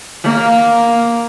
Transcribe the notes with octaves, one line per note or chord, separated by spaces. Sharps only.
A#3